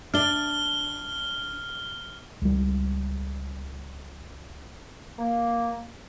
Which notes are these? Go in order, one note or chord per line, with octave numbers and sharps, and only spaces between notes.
D4 D5 F6 G7
C#2 G3
A#3